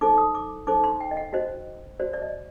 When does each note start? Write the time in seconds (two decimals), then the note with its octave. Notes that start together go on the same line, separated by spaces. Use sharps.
0.01 D#4 A4 C5 D6
0.18 D#6
0.35 D6
0.67 D#4 A4 C5 D6
0.84 C6
1.00 G5
1.11 D#5
1.17 F#5
1.33 F#4 C5 D#5
2.00 F#4 C5 D5
2.13 D5
2.22 D#5